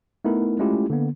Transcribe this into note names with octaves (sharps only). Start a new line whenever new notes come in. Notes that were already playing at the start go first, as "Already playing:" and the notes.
A3 B3 D#4 E4 A#4
G#3 A3 C#4 E4 F4 G4
D3 A#3 B3